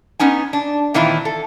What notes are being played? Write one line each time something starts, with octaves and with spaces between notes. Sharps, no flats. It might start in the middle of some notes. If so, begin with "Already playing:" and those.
B3 C#4 D#4 G#5
D4
A#2 D#3 E3 C4 E4 F4
A4